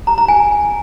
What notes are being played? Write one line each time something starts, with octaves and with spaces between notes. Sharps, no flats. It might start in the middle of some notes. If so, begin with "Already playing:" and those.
A#5
A#5
G#5